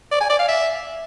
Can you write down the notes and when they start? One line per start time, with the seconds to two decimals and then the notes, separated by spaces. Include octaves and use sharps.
0.11 D5
0.21 G#5
0.30 D5
0.39 F5
0.48 E5